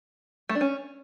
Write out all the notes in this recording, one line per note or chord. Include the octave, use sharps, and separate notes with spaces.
A3
D4
C#4